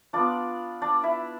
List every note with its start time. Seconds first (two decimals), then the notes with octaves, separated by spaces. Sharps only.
0.13 B3 D4 F4 D5
0.82 D4 D5
1.03 E4 E5